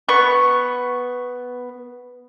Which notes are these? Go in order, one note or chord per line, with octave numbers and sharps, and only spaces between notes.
B3 C#6